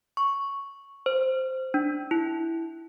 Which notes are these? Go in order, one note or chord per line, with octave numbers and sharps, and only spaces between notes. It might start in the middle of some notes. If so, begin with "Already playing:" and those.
C#6
C5
D4
E4